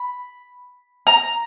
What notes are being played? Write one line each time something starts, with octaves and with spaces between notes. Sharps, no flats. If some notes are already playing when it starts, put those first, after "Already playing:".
Already playing: B5
A#5